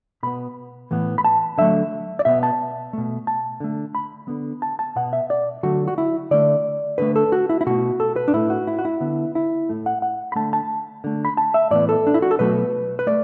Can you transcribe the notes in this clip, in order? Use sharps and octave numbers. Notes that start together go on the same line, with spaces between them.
B2 B3 B5
A2 E3 B3
B5
A5
D3 F#3 A3 E5
D5
B2 B3 E5
A5
B2 A3
A5
D3 A3
B5
D3 B3
A5
A5
B2 B3 F#5
E5
D5
D3 F#3 A3 F#4
F#4
E4
D3 A3 D5
D3 A3 B4
A4
F#4
E4
E4
B2 A3 F#4
A4
B4
D4
A2 A3 E4
F#4
E4
F#4
E4
D3 B3
E4
A2 A3
F#5
F#5
B5
D3 A3 A5
A5
D3 A3
B5
A5
E5
A2 E3 B3 D5
A4
D4
E4
F#4
A4
B2 F#3 A3 B4
B4
A3 D5